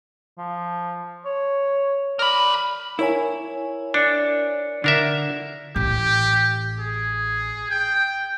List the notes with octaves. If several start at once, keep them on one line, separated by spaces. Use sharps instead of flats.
F3
C#5
A#4 D5 B5
E4 A#4 C#5 G#5
D4 D5 C#7
D3 D4 A#4 E5
A1 G4
G#4
G5